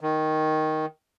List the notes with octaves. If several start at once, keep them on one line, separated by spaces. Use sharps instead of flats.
D#3